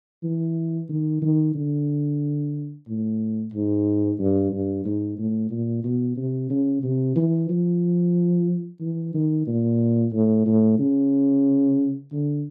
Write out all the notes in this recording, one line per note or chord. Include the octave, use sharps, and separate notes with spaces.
E3
D#3
D#3
D3
A2
G#2
G2
G2
G#2
A2
A#2
B2
C3
C#3
C3
E3
F3
E3
D#3
A#2
A2
A2
C#3
D3